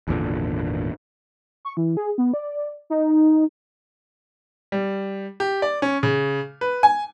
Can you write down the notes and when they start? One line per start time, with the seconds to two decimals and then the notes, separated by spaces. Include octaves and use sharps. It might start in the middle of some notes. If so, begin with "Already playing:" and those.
0.08 G#1 E2 A#2 D3
1.65 C#6
1.77 E3
1.97 G#4
2.18 B3
2.34 D5
2.90 D#4
4.72 G3
5.40 G4
5.62 D5
5.82 C#4
6.03 C#3
6.61 B4
6.83 G#5